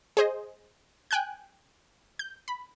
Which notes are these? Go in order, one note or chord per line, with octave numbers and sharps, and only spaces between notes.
G#4 C5 D#5
G5 G#5 F#6 G6
G6
B5